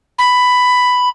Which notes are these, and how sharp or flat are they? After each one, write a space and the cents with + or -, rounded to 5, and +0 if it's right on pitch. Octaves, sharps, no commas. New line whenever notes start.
B5 +10